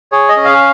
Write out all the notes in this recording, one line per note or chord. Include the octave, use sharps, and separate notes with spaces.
G#4 C#5
D#5
C#4
F5